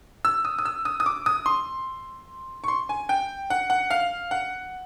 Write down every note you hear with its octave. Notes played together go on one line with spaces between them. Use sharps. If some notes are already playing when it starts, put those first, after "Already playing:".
E6
D#6
D#6
E6
D#6
D#6
D6
D#6
C6
C#6
C6
G#5
G5
F#5
F#5
F5
F#5